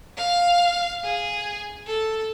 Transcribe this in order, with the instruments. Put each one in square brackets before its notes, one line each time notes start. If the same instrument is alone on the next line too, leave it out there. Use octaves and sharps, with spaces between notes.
[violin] F5
G#4
A4